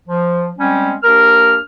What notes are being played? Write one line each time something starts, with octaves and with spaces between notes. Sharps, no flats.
F3
G3 G#3 C4 C#4
D#2 D4 A#4 F6